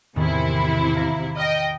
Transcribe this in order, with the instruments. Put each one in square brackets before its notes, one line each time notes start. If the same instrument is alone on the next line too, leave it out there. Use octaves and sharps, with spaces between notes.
[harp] E2 A2 D#3 [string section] C3 E4
[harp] F5 A#5 A#6
[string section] D#5 G5 [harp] F6